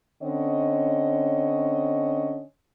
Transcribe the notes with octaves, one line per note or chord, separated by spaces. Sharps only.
D3 C4 C#4 C#5 D#5